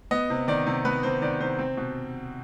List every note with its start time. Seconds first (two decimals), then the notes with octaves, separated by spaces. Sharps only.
0.11 B3 D#5
0.30 C3
0.48 D#3 D5
0.67 C3
0.85 B3 B4
1.03 C3 C5
1.22 D#3 D5
1.40 C3 C5
1.59 C4
1.77 B2